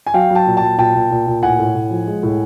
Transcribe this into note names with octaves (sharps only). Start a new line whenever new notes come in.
G#5
F#3 F5 G5
F#3 G5 A5
A#2
G5 A5
F#3
A#2 G5 A5
A#2
A#2
A#2
A2 F#5 G#5
A2
A2
F3
G#3
A2